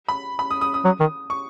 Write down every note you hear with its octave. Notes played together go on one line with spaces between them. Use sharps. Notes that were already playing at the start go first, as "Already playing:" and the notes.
B5
B5
D#6
D#6
D#6
F#3
D#3
C#6